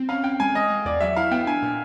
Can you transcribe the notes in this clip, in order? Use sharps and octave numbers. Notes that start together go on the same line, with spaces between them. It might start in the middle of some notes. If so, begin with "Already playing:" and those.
Already playing: C4
C#4 F5
C#4 G5
G#3 G#5
G#3 D#5
G#3
E2 D5
F#3 E5
E4 F5
B3 G5
D4 G#5
A#2